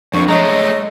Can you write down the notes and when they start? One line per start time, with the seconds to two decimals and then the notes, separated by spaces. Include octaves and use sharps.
0.14 F2 F3 D4 C#6
0.28 G#3 A3 C#5 D#5 A#5